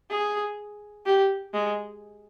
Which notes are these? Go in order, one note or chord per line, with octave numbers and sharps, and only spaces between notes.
G#4
G4
G#3